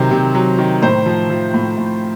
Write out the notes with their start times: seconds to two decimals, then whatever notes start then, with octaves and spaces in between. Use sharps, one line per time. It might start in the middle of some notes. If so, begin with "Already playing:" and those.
Already playing: C3 D#3 F#3 C5
0.11 C3
0.35 F#3
0.59 D#3
0.82 A2 C5
1.06 F3
1.30 F3
1.54 A2
1.77 A2